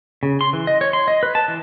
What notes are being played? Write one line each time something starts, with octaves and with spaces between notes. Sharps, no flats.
C#3
C6
E3
D#5
C#5
C6
D#5
B4
A5
E3